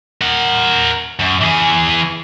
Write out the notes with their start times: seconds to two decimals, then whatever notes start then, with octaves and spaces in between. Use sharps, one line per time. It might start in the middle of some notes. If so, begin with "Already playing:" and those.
0.21 A#4 F#5
1.19 F#2
1.41 E3 G#4